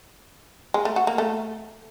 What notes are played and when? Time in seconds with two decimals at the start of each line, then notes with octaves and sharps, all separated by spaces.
0.74 G#3
0.85 A3
0.96 F#4
1.07 A#3
1.18 A3